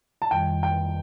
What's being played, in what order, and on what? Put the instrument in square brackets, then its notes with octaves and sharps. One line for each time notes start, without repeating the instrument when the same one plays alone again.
[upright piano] A5
[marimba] F2 D#3 G3 [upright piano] G5
[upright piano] G5